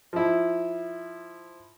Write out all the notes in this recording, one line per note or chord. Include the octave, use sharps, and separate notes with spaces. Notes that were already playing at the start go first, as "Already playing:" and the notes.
F3 E4